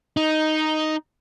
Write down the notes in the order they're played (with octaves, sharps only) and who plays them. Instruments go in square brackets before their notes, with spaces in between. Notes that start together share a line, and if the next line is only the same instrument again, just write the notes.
[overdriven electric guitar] D#4